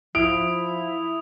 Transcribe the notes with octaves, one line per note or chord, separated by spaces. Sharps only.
F3 E4 D#6 D7